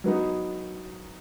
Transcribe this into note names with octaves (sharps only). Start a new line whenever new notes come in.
F#3 B3 D#4